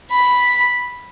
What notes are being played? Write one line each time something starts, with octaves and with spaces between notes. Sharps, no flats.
B5